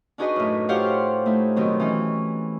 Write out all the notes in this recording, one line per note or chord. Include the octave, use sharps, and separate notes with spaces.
D4 D#4 F#4 G#4 B4 D#5
F#2 A2
F4 G4 C5 C#5 F5 F#5
A3 D#4 E4
B2 D#3 F#3 C4
E3 C#4